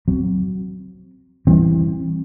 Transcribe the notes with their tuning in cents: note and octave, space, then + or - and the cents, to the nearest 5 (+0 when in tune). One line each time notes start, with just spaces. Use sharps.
F#3 +10 C4 +0
E3 +0 G3 +0 C4 +35